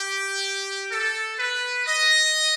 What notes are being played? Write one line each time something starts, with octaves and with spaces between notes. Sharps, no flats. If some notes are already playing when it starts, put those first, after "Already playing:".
Already playing: G4
A4
B4
D#5